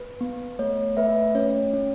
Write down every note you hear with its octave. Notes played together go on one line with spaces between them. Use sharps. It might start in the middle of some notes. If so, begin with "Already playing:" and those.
Already playing: B4
B3
A3 C#5
A3 B4 E5
C#4 C#5
C#4